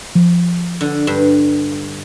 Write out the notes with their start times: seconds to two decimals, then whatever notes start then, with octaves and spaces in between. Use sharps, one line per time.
0.15 F3
0.81 D3
1.07 G2